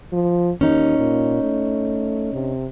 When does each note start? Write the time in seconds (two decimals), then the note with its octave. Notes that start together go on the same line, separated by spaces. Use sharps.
0.13 F3
0.61 D#2 C#4 D#4
0.98 A#2
1.42 A3
2.33 C3